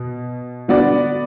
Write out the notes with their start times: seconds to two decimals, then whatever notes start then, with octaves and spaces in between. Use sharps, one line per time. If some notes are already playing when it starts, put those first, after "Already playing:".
Already playing: B2
0.68 D3 B3 F#4 D5